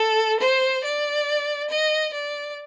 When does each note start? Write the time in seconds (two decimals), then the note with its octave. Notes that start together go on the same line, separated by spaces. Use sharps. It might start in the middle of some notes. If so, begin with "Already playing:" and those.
Already playing: A4
0.40 C5
0.84 D5
1.70 D#5
2.14 D5